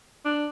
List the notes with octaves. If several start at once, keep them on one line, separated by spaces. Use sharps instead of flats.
D4